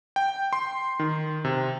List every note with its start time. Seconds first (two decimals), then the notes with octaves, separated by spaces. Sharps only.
0.16 G5
0.53 C6
0.99 D#3
1.45 C3